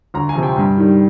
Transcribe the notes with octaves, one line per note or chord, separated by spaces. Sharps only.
D2 A#5
G#5
C3 F3
G5
G2
D#3 G3